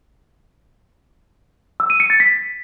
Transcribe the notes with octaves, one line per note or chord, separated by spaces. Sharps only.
E6
D#7
C#7
A6
B6